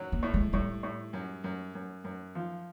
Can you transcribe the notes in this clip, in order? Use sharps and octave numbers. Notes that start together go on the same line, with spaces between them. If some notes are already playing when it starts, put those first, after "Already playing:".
Already playing: F#2 F#3
A#3
A2
G#3
A2 G3
A2
F#2
F#2
F#2
F#2
F3